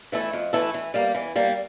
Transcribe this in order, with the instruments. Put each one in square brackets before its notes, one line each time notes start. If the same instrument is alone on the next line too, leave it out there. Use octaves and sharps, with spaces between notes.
[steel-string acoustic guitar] E3 A3 E4 A4
F2
E3 A3 E4 A4
E3
G3 A#3
E3
G3 A#3